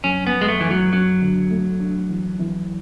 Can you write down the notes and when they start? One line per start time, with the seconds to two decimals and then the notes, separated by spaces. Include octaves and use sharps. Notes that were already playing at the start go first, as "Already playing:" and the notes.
0.04 F#2 C#4
0.27 B3
0.33 F#2
0.41 G#3
0.49 A3
0.61 F#2 E3
0.71 F#3
0.93 F#2 F#3
1.21 D3
1.51 A3
1.80 D4
2.10 E3
2.39 E3